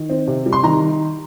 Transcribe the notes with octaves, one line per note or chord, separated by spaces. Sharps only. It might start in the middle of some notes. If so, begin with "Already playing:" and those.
Already playing: D#3
C4
C3
G3
C6
D#3 A#5